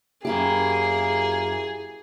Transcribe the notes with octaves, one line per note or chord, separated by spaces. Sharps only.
F#2 A#3 E4 G4 G#4